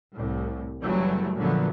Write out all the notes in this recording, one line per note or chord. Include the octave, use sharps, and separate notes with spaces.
C2 A2
F#1 E3 F#3 G3 A3
A#2 D3 F3 F#3 A3 B3